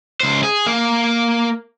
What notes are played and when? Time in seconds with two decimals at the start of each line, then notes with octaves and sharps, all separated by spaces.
0.20 C#2 C5
0.43 G#4
0.66 A#3